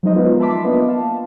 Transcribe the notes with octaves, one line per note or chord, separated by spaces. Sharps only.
F3 F#3 G#3 D#4 C5 D#5
B3 D#4 F4 A#4 B4
E5 A5 B5 C6 D6 B6
A#3 B3 D4 F4 B4 D#5
F5 A5